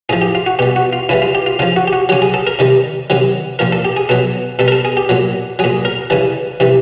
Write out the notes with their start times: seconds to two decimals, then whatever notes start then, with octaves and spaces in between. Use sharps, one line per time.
0.09 A2 F3 G#4
0.22 G4
0.35 F4
0.46 F#4
0.59 B2 G3 G4
0.76 F#4
0.93 F4
1.09 C#3 E3 G3 E4
1.22 F4
1.35 G4
1.46 F4
1.59 C#3 F3 F4
1.76 F#4
1.88 G4
1.93 F#4
2.09 C#3 F#3 G4
2.22 G#4
2.34 A4
2.47 A#4
2.59 C3 D#3 G3
3.10 C3 D#3 F#3
3.59 A#2 F3 A#4
3.72 A4
3.85 G4
3.97 G#4
4.09 B2 F#3 A4
4.59 B2 G3 A4
4.68 A#4
4.72 A4
4.85 G#4
4.97 G4
5.09 A#2 F#3
5.59 A#2 F#3 G#4
5.85 A#4
6.10 C#3 E3 G3
6.60 C3 E3 G3